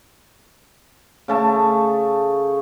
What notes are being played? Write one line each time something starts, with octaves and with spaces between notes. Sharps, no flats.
C#3 A3 A5